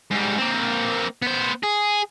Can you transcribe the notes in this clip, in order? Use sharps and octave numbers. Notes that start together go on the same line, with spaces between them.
G#2 G3
A#3 C4
B3 C5
G#4